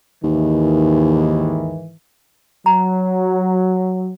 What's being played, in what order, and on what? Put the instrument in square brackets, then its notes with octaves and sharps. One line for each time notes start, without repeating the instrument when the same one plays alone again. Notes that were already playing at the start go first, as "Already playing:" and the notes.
[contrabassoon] D#2 [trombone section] G#2 D#3 E3
[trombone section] F#3 [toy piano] A#5